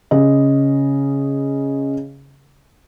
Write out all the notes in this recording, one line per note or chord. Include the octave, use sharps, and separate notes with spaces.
C#3 G#4 D#5